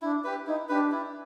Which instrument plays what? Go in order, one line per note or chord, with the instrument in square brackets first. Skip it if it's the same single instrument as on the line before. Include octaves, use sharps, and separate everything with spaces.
[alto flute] D4 [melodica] E4
[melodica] G4 B4
[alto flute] D#4 [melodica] E4
[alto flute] D4 [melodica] G4 B4
[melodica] E4